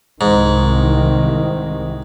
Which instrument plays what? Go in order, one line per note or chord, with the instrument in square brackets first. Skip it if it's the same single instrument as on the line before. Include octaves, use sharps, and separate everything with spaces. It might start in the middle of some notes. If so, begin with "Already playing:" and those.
[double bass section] C2 D#3 [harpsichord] G#2